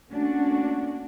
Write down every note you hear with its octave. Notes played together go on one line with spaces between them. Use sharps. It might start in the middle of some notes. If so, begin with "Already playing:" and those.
A3 A#3 C#4 D4 F#4